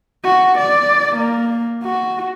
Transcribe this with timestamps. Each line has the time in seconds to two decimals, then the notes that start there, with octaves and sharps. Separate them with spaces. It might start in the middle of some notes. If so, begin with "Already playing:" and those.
0.24 F#4
0.58 D5
1.16 A#3
1.84 F#4